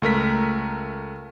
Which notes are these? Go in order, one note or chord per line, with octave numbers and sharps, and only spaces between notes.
C#2 A3 A#4 B6